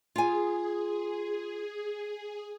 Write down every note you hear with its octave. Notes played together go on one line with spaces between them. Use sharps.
F4 G#4 G#5